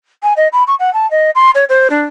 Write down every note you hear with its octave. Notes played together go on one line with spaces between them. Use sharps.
G#5
D#5
B5
C#6
F#5
A5
D#5
C6
C#5
C5
D4